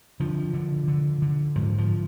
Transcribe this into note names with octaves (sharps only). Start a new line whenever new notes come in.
D3 F3
D3
D3
D3
G#2 F3
F3